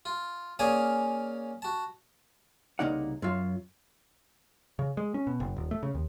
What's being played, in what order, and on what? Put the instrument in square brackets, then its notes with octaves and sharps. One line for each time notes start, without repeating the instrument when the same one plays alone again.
[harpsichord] F4
A#3 C#4 G#4 D5 F5 G#5
F#4 A5
[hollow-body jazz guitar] C2 C#3 A#3 D#4 D5 F#5
F#2 F#3 F4
[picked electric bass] C#3
G#3
C#4
B2
F#1
D#1
A3
C#3
D#2